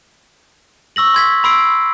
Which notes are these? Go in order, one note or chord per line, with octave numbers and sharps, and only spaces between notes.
C#6 E6 A#6 F#7
C6 G#6 B6
B5 C6 E6 C7 D7